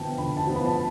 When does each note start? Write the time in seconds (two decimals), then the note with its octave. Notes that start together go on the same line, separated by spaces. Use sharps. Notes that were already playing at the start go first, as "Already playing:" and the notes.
Already playing: D3 F3 B3 G5 A5
0.18 D3 B5
0.37 A5
0.47 F3 B3
0.56 B5
0.66 A5